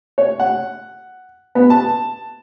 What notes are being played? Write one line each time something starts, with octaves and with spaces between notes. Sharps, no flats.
C#5
F#5
B3
A5